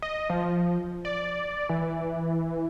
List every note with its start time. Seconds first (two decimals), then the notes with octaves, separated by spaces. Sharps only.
0.02 D#5
0.30 F3
1.05 D5
1.69 E3